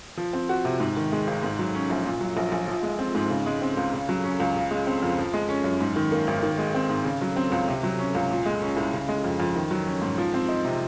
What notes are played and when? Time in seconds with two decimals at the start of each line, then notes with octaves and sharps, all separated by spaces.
0.17 F3
0.33 C4
0.49 F#4
0.65 C3
0.80 G#2
0.96 D#3
1.12 G#3
1.27 G#1
1.43 G#2
1.59 F#3
1.75 C#4
1.90 A#1
2.06 A#2
2.21 F#3
2.37 A#1
2.52 A#1
2.68 F3
2.83 G#3
2.99 C4
3.15 G#2
3.30 C#3
3.46 G#3
3.62 C4
3.77 C#2
3.93 C#3
4.09 F#3
4.24 C#4
4.40 C#2
4.56 C#3
4.71 G#3
4.87 C4
5.03 F2
5.18 F3
5.34 G#3
5.49 C#4
5.64 F#2
5.81 G#2
5.96 D#3
6.12 A#3
6.27 G#1
6.43 D#3
6.58 G#3
6.74 C4
6.90 G#2
7.05 C#3
7.22 F#3
7.36 C4
7.52 C#2
7.68 C3
7.83 F#3
7.99 C#4
8.15 C#2
8.30 A#2
8.46 G#3
8.62 C#4
8.77 C2
8.93 C#3
9.09 G#3
9.24 F2
9.40 F2
9.56 D#3
9.71 F#3
9.87 C#4
10.02 G#2
10.18 F3
10.34 C4
10.49 D#4
10.65 C3